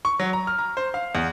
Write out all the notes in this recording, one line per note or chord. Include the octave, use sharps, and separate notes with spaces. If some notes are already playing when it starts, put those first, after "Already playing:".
C#6
F#3
A#5
F6
A#5
C5
F5
E2